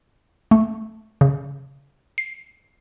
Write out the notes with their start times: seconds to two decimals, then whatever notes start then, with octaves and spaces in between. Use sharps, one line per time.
0.51 A3
1.21 C#3
2.18 C7